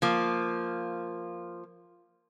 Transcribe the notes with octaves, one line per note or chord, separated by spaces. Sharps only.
F3 A#3